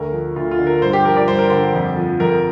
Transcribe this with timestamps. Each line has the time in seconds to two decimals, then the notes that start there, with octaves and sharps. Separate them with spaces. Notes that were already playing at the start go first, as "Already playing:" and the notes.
Already playing: D2 A#4
0.13 F3
0.36 D2 F4
0.51 F4
0.59 D3
0.67 A#4
0.81 G2 C5
0.93 G4
1.05 F3 A#4
1.17 D5
1.27 G2 C5
1.39 A#4
1.50 D3 C5
1.74 F2
1.96 F3
2.20 F2 A#4